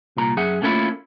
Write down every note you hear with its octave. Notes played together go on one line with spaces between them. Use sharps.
C2 A#2 A#5
F#2 G#4 E5 F#5
A3 A#3 C#4 D4 E4 F4